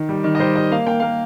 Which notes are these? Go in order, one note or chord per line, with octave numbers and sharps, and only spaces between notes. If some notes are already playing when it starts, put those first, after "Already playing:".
Already playing: D#3
G3
D#3
D#5
G3 C5
G3 D#5
A#3 F5
A#3 G5
A#3 F5